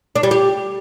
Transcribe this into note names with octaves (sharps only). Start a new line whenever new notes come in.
D4
G3
G4